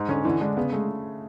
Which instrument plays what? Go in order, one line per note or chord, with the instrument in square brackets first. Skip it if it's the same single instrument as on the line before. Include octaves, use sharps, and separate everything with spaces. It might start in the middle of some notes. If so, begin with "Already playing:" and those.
Already playing: [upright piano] G#2
[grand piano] D3 [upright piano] C#4
[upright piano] D3 [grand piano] E3
[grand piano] G#3 [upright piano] D4
[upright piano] C#3 [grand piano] B3
[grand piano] G#3 [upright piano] A3